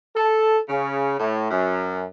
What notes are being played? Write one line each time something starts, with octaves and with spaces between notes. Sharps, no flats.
A4
C#3
A2
F#2